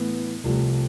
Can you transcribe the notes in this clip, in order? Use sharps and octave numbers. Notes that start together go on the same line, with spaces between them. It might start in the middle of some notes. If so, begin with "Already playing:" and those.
Already playing: A2 E3 B3
C2 C3 F3 A3